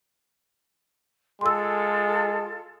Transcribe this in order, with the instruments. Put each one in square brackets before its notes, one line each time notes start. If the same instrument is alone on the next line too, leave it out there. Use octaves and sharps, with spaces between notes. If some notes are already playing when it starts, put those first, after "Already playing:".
[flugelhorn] G#3 [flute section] F4 A4 [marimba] C6 E6